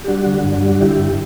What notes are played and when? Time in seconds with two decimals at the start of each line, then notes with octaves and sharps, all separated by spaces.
0.04 G4
0.08 G3 D4 F#4
0.26 D3
0.44 G2
0.62 G3
0.81 D3 E4 G4
0.98 G2